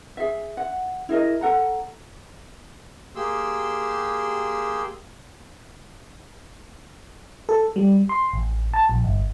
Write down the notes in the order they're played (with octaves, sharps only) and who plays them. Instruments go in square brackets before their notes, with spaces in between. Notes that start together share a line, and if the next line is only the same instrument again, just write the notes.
[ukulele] G#4 E5
F#5
E4 G#4 A#4 D#5
A4 F#5 A#5
[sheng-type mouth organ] A#3 G4 G#4 C6 E6
[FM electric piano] A4
G3
C6
A1
A5
A#1
G1